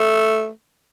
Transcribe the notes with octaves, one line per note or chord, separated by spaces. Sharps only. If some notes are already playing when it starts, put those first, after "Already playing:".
Already playing: A3